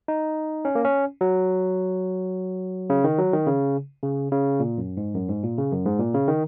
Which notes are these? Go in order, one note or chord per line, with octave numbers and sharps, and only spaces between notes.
D#4
C#4
A#3
C#4
F#3
C#3
D#3
F#3
D#3
C#3
C#3
C#3
A#2
F#2
G#2
F#2
G#2
A#2
C#3
F#2
G#2
A#2
C#3
D#3